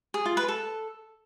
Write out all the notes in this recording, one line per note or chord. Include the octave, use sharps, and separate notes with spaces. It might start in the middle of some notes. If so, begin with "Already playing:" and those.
G#4
F4
B4
A4